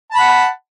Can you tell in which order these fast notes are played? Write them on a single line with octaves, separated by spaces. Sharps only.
A5 B5 F#5